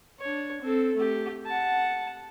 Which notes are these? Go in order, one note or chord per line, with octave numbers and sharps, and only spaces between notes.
D4 C#5
C4 A4
A3 G4
F#5 A5